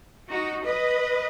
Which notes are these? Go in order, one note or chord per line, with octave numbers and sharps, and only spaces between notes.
D#4 F#4
B4 D#5